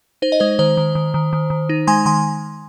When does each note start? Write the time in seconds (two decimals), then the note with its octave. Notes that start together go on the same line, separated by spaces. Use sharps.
0.22 D#4 C5
0.32 D#5
0.40 G#3 C5
0.59 D#3 C5
0.77 D#3
0.95 D#3
1.14 D#3
1.33 D#3
1.50 D#3
1.69 D#4
1.87 G#3 G#5 C6
2.06 D#3 G#5 C6